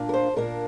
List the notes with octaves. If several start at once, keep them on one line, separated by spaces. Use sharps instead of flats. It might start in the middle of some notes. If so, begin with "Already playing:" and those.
Already playing: A#2 A#3 D4
A#4
C5
A#2 A#3 D4 A#4